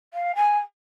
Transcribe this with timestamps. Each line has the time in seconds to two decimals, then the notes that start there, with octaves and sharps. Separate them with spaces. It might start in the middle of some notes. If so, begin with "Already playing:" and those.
0.14 F5
0.35 G#5